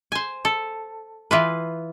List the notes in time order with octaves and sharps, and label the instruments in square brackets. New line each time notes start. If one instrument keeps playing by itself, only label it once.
[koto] C5 G#5
A4
E3 F4 B4